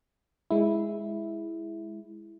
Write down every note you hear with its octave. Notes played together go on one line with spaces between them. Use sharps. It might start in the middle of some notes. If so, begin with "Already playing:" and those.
G#3 E4